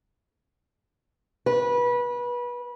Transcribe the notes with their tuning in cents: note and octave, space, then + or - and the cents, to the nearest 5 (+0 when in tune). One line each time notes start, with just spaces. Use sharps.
B4 -25